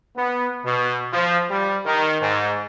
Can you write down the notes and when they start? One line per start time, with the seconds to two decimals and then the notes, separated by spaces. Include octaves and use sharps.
0.16 B3
0.64 B2
1.12 F3
1.49 G3
1.84 D#3
2.20 G#2